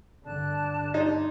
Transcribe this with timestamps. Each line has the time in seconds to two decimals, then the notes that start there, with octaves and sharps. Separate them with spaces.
0.24 G2 D3 D5 A5 F#6
0.94 D#4 C#5 D5 C6